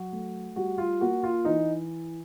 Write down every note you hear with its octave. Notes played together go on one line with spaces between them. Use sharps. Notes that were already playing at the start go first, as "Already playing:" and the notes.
Already playing: F#3 F#4
A3
G3 F#4
F4
A#3 F#4
F4
E3 D#4